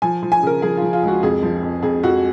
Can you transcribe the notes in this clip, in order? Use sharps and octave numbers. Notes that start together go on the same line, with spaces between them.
F3 G#5
F3
G#5
C#3 A#4
F3 G#4
F3 F4
F4
C#2
F#4
F2 G#4
F3
F2
F2 G#4
F2 F#4